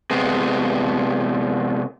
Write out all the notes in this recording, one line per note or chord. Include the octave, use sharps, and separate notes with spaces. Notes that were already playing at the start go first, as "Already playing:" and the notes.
C3 G#3 B3